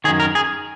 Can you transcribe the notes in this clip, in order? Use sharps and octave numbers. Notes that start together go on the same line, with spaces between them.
F#2 D#3 G#4
A#4
G#4